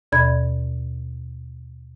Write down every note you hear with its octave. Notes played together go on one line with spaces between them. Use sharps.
D#2 B2 D5 B5 G#6